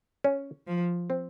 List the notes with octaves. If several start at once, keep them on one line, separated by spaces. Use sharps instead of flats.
C#4
F3
C4